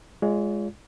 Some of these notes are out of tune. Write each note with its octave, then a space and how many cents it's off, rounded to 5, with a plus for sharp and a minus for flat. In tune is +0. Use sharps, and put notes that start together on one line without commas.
G#3 +0 F4 -10 C#5 +45